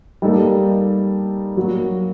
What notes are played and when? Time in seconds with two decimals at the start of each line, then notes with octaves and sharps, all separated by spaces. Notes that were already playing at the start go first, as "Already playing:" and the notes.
0.22 G3 A#3 D#4 A4
1.57 F#3 A#3 F#4